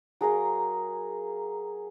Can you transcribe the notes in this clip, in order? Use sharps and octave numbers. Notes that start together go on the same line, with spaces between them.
F#3 G#4 A#4 F5